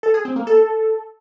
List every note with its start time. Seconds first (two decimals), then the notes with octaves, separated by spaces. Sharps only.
0.03 A4
0.14 G#4
0.25 C4
0.36 A#3
0.47 A4